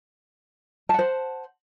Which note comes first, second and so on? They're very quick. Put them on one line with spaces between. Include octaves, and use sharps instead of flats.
A5 F#5 C5